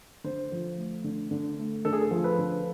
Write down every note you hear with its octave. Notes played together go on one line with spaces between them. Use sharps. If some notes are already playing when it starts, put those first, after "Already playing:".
D3 C5
F3
A3
D3
D3
A3
D3 A4
G#4
A4
F3
B4
D3